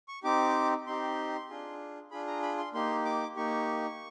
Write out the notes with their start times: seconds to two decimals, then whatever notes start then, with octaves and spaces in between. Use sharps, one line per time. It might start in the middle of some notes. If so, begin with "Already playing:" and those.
0.08 C#6
0.23 C4 D#4 G4 D6
0.87 C4 D#4 G4 C6
1.49 D4 F4 G#4
2.11 D4 F4 G#4 B5
2.27 A#5
2.42 B5
2.58 C6
2.74 A#3 D#4 G4 C6
3.05 D6
3.36 A#3 D#4 G4 C#6